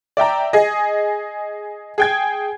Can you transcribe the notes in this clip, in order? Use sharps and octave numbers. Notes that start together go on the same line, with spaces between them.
D5 E5 G5 A#5
G#4 D#5
G#4 G5 G#6